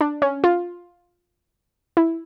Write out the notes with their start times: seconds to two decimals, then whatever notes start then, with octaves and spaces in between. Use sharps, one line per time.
0.01 D4
0.22 C#4
0.44 F4
1.97 E4